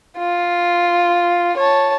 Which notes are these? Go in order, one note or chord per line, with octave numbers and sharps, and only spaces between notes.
F4
C#5 A5